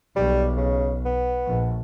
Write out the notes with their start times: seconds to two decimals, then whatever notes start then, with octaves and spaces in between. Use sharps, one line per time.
0.16 B1 G3
0.57 C#3
1.05 B3
1.46 A#1